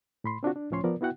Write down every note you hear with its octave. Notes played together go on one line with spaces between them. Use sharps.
A2 B5 C6
C4 D4 F4 F#4
D4
C#2 A2 F3 C#4 C#5 C6
F3 B3 F4 A#4 D5
B3 E4 F#4 F#5 G5